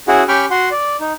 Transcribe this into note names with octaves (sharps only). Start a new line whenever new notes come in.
C#4 E4 F#4 G#4 F#5
C#4 G4 G5 B5 C#6 F6
F#4 F#5 C6
D5
D#4